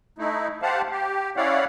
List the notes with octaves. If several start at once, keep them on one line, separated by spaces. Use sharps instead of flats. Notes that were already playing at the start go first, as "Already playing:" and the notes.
A3 D#4 E4
G4 C5 F5 F#5 A5
G4
C#4 E4 C#5 D5 F5 F#5